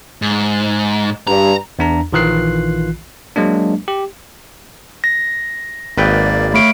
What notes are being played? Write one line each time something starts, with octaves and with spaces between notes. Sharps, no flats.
G#2
G2 A#5
E2 D4 A#5
A#1 D#3 E3 F4 F#6 C7
F#3 G#3 A#3 D4
G4
A#6
G#1 A#3 B4 D5 G5
A3 C#5 F5 B5 D7